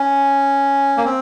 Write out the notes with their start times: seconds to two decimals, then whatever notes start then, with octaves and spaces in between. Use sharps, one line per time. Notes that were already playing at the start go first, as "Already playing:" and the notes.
Already playing: C#4
0.97 A#3
1.05 C4